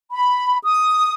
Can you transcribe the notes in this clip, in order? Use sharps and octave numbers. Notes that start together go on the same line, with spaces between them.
B5
D#6